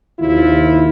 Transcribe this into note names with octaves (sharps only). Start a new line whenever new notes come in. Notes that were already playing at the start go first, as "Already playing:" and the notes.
G#1 D#2 C3 E4 F4